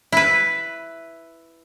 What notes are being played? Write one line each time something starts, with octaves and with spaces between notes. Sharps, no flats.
E4 B4